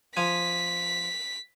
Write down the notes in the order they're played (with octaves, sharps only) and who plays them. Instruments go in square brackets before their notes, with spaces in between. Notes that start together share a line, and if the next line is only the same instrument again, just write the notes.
[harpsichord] F3 G#5 [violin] B6